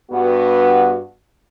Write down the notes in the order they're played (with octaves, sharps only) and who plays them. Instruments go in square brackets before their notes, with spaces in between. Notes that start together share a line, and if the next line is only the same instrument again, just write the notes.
[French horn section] G2 B3 F#4